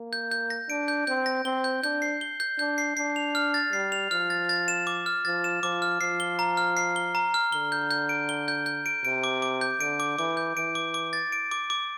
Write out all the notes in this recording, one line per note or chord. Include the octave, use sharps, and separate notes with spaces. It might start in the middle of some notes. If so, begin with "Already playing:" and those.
Already playing: A#3
G6
G6
A#6
D4 D7
G6
C4 G6
A#6
C4 G7
G6
D4 G6
C7
G7
G6
D4 G6
C7
D4 C7
F7
F6
A6
G3 C7
F7
F3 F6
A6
A6
E7
D6
F6
F3 A6
E7
F3 D6
F6
F3 C7
G7
A#5
F6
C7
G7
A#5
F6
D3 G7
G6
G6
D7
G7
G6
G6
D7
C3 D7
D6
D6
G6
D3 D7
D6
E3 D6
G6
E3 D7
D6
D6
A6
D7
D6
D6